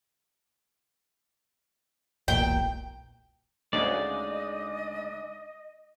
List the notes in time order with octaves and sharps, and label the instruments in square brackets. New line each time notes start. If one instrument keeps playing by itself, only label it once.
[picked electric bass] E1 B1 A#2 [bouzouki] G5
[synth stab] D2 C#3 [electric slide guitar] G#3 D4 D#4 [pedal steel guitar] D5 [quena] D#5